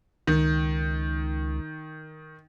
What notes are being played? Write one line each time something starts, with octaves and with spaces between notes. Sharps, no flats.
C#2 D#3